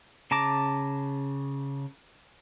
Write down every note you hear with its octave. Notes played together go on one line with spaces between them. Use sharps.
C#3 A5 A#5 D6